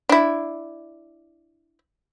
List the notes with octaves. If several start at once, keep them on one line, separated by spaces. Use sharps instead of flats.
D4 E4